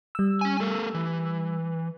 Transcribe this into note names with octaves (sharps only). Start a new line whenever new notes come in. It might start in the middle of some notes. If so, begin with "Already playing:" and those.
G3 E6
C#4 G#5
A3 A4 A#4
E3